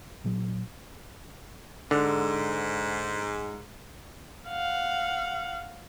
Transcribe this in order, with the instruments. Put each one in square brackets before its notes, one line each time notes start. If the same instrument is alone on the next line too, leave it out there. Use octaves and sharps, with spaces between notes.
[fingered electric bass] A#1 A#2 F#3
[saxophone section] G#2 [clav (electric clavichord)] D3
[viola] F5 F#5